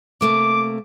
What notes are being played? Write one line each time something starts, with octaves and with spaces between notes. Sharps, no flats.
C3 A3 A#3 D6